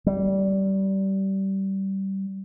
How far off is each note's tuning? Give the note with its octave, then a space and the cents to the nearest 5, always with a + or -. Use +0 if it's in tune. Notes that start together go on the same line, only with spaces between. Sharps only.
G3 -20